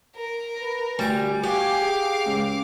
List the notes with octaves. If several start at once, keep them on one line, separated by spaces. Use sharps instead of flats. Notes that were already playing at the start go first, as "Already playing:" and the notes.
A#4
B4
D2 G3 G#5 A#5 C#6
F#4 G4 F5 D6
G#4
C#2